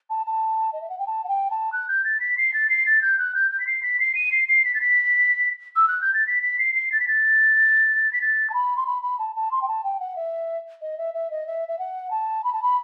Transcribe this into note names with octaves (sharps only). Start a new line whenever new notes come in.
A5
A5
D#5
E5
F#5
G5
A5
F#5
G5
A5
F#6
G6
A6
B6
C7
A6
C7
A6
G6
F#6
G6
G6
B6
C7
B6
C7
D#7
C7
C7
B6
A6
B6
E6
F#6
G6
A6
B6
B6
C7
C7
A6
B6
A6
B6
A6
A5
B5
C6
B5
B5
A5
A5
C6
G5
A5
G5
F#5
E5
D#5
E5
E5
D#5
E5
E5
F#5
A5
B5
A5
B5